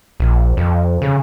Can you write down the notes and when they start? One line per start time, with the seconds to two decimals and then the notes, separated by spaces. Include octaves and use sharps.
0.20 A#1
0.57 F2
1.02 C#3